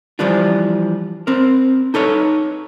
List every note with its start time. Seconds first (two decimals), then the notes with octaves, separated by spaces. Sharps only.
0.19 E3 F3 G3 D4 F4
1.27 C4 A#4
1.94 D#4 A4 B4 C#5